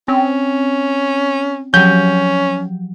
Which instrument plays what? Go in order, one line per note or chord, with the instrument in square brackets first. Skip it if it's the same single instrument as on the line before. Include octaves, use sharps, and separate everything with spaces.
[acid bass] C4 [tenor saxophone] C#4
[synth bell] F3 F#3 [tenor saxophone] C#4 [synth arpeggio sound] G6